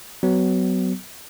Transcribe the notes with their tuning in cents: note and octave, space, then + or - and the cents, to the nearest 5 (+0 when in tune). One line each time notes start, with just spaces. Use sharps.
F#3 +20 B3 +30